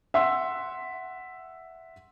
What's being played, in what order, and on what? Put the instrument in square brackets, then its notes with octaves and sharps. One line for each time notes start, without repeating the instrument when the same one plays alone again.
[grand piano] E5 F#5 C6 E6